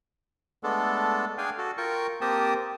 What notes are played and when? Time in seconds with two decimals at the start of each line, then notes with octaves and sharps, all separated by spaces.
0.63 G#3 A3 B3 D4 A4
1.38 D4 G#4 F5 G5 G#5
1.58 F#4 A4
1.78 F4 A#4 G5 C#6
2.21 A#3 C4 G4 G5 A5 D#6